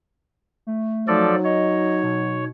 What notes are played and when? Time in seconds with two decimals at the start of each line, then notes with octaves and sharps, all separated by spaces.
0.67 A3
1.08 F3 F#3 D#4 A4 D5
1.44 C#5 D#5
2.03 B2